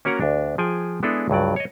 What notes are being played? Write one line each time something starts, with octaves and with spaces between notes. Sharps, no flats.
A#3 C#4 F#4 A#4 F#5 A#5
D2 D4
F3 G#4 G5 G#5
G#3 B3 D4 E4 G#4 A4
C#2 G2 F#3 D5
C#5 D#5